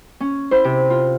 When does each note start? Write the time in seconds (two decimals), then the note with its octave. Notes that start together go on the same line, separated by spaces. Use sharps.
0.21 C#4
0.51 E4 C5
0.65 C3
0.90 F4